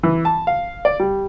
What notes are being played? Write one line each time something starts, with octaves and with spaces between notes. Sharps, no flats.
E3
A5
F5
D5
G3